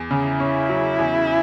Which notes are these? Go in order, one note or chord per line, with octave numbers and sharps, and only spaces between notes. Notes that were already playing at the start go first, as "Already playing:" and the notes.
Already playing: E2
C#3
E4
C#4
F#3
E2